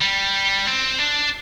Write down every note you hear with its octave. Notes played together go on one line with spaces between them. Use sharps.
G3
C4
D4